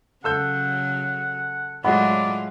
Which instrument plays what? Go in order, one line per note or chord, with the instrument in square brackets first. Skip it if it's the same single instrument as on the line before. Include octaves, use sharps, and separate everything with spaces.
[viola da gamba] C#3 F#3 [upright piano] A4 E6 G6 [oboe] F#5
[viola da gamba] A2 F#3 F4 [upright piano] G#3 D#5 B5 [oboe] D5 [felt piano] F#5